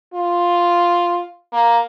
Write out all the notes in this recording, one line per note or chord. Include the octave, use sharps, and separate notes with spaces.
F4
A#3